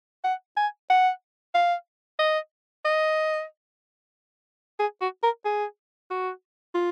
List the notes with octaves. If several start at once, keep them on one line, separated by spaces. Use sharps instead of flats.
F#5
G#5
F#5
F5
D#5
D#5
G#4
F#4
A#4
G#4
F#4
F4